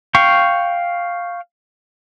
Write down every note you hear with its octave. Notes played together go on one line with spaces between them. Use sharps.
F5 G5 C#6